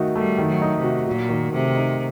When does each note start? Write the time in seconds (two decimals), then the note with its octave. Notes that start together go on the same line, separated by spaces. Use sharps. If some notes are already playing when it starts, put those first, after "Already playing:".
Already playing: D#3 A3 D#4 F#4
0.16 G3 A3
0.38 D#3
0.46 F#3
0.62 D#4
0.77 C3
0.83 F#4
1.06 A#2 F#3
1.29 D#3
1.52 C3 A3
1.75 D#4